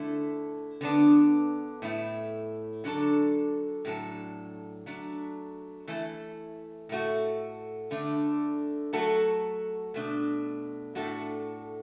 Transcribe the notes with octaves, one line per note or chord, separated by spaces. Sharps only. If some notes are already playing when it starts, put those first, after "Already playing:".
Already playing: D3 A3 E4 A4
D3 B3 D4
A2 A3 E4
D3 F#3 D4 A4
A2 F#3 D4 A4
F#3 A3 D4
E3 A3 E4 A4
A2 A3 F#4
D3 A3 D4
F#3 A3 F#4 A4
B2 A3 D4
A2 A3 D4 F#4 A4